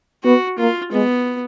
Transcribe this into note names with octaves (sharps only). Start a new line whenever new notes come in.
B3 F#4
A#3 F4
G#3 B3